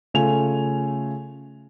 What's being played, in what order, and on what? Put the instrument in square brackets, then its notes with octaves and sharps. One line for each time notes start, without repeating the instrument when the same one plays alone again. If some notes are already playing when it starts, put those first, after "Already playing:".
[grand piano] C#3 A3 F4 G#5 F7